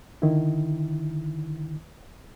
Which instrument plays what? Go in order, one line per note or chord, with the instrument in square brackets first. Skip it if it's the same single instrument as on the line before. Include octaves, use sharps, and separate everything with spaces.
[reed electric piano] D3 D#3 E4